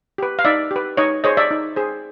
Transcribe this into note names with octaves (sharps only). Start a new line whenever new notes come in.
G4 B4
F5
D#4 D5 E5
G4 B4
D#4 C#5 D#5
G#4 C5 C#5 D#5
D5 E5
D#4
G#4 C5